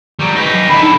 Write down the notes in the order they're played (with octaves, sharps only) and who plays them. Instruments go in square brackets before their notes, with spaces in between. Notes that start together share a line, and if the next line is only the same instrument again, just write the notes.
[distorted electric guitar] F#3 G3
D#4 B4
[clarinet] F#3
[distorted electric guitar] D3 E4 [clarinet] B5
[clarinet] D#4